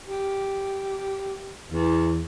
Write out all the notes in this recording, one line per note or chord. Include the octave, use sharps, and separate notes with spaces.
G4
E2